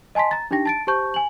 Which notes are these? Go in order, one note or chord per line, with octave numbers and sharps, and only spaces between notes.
D#5 G#5 A5 C6 B6
A#5 A6
D4 D#4 G4 G5 A#6
A5 A6 D7
G4 C5 A5 C#6 G6
G#5 F#7